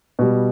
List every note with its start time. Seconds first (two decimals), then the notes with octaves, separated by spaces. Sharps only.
0.19 B2 G3